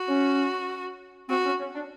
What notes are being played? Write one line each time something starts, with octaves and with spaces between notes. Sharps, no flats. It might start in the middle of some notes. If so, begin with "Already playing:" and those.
Already playing: F#4
C#4
C4 F#4
C#4
C#4
D4